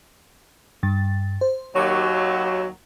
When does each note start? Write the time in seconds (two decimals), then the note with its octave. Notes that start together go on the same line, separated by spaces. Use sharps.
0.83 G2 A6
1.41 C5
1.76 D#2 F#3 C#6 D6